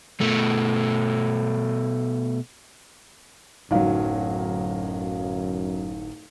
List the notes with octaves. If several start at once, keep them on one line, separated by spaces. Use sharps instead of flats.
B2 A3
D1 G1 F#2 F#3 D#4 F5